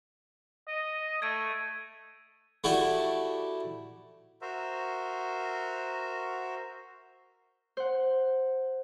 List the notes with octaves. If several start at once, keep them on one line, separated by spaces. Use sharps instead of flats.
D#5
A3 G#6 D7 D#7
A3 E4 F#4 G4 D5
F#4 A#4 C5 E5
C5 F#5